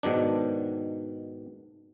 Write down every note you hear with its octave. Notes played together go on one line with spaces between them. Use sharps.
G#2 B2 D#3 D4